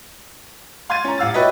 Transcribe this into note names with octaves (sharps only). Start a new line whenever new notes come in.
F5 C6 G#6 A6 D#7
C#4 A#5
D#1 F5 E6 A6
F#4 G4 B4 C#5 D#5 E5